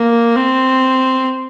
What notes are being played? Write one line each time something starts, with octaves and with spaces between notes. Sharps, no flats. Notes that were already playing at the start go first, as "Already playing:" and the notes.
Already playing: A#3
C4